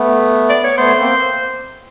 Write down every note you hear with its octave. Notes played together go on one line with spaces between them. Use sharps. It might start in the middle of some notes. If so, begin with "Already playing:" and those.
Already playing: A3 B3
D5
C#5
A3 B3 C5
A#3 C4